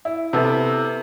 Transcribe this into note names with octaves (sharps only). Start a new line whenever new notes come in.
E4
C3 B3 E4 A4